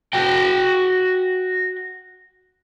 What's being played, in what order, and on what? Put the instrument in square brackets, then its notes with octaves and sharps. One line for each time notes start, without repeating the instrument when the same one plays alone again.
[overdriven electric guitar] F#4 G5